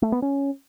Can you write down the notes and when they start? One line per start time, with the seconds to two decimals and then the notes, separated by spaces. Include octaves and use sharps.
0.02 A3
0.12 B3
0.22 C#4